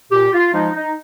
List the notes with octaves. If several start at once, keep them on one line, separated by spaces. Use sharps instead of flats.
A#2 G4
F4
F3 G#3 D#4
D#4